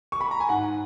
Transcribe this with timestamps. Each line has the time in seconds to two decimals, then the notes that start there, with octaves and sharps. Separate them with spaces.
0.12 C#6
0.21 B5
0.31 A#5
0.40 G#5
0.49 G#2 F#5